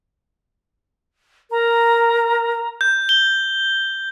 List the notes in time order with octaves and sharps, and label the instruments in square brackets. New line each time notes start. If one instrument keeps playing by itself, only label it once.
[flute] A#4 [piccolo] A#5
[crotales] G6
G7